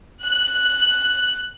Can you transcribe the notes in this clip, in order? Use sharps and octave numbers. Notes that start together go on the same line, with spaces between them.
F#6